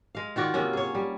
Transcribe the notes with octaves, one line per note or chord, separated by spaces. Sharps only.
G#3 F5
D#3 F4 F#4 D5
C3 A#3 C#4
G#4 C#5
G3